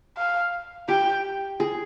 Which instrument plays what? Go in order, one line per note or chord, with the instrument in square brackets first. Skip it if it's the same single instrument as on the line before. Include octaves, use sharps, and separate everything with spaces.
[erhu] F5
[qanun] G4 [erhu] G5
[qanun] G#4